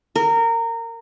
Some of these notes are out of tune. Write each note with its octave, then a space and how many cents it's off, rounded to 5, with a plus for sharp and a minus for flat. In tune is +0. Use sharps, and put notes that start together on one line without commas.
A#4 -20